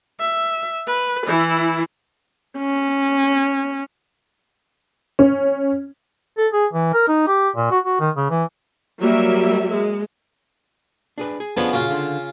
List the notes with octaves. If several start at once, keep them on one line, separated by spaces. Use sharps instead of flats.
E5
B4
E3 E4
C#4
C#4
A4
G#4
E3
A#4
D#4
G4
A#2
F#4
F#4
D#3
C#3
E3
F#3 G3 A#3 E5
G#3
D4 G#4 B4
G#4
D3 F3 B3 C#4 G#4 C#5
A#2 C#3 A#3 F4 F#4
D3 C6